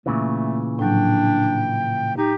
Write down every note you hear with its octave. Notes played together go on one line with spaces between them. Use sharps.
A#2 C#3 E3 A3
A2 F3 F#3 D4 G5
D#4 G4